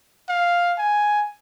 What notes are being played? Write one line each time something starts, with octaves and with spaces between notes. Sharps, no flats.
F5
G#5